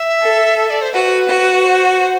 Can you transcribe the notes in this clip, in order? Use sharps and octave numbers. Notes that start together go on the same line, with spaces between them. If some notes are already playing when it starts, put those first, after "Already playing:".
Already playing: E5
A4
E5
D5
C5
F#4 B4
F#4
C5